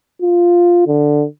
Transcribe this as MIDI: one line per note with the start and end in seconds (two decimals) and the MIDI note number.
0.22 0.86 65
0.87 1.25 50